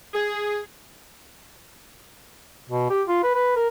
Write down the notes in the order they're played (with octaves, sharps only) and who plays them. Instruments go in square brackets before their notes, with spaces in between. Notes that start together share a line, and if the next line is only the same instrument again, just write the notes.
[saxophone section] G#4
[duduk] B2
G4
F4
B4
B4
A#4